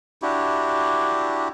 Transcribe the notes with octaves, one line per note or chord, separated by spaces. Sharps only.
D4 E4 F#4 G4